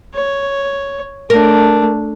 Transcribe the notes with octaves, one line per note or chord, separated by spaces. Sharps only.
C#5
A3 D4 A#4